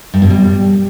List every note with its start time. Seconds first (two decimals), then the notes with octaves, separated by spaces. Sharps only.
0.14 G2
0.22 B2
0.30 G3